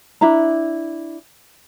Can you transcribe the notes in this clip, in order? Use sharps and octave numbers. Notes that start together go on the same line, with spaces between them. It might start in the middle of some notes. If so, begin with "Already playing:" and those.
D4 E4 A#5